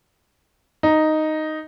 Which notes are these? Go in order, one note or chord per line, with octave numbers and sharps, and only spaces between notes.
D#4